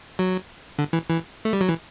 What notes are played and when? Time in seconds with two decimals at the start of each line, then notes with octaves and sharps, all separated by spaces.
0.19 F#3
0.79 D3
0.93 E3
1.09 E3
1.45 A3
1.53 G3
1.61 F#3
1.69 E3